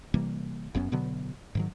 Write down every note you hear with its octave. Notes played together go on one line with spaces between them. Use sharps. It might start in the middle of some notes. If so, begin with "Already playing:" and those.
C3 E3 G3 A#3
F#1 F#2 B3 C#4
B2 D3 F#3 B3
G#2 D#3 F#3